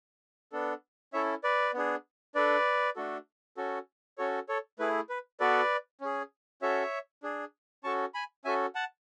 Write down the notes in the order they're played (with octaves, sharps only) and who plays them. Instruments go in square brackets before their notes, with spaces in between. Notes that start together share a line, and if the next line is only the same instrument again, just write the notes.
[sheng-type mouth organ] B3 D4 A4
C#4 E4 A4 C#5 E5
B4 D5
B3 D4 G#4
D4 A4 B4 D5
A3 D4 F#4 A4
C#4 F#4 A4
C#4 F#4 A4 C#5
A4 C#5
A3 E4 G#4 B4
B4
B3 F#4 A4 B4 D5
C#4 G#4
C#4 F#4 A4 C#5 E5
D4 G#4
C#4 F#4 A4 A5 C#6
G#5 B5
C#4 F#4 A4 E5 G#5
F#5 A5